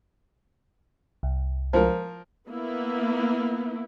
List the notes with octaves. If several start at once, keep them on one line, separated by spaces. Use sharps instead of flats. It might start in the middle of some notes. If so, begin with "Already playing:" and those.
C2
F3 A#4
A#3 B3 E4